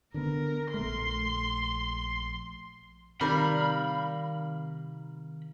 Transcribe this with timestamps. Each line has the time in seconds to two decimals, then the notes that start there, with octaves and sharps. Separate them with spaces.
0.14 D3 B3 A#4
0.74 A#1 A3 C6
3.21 C3 D#3 G3 A#4 F5 B5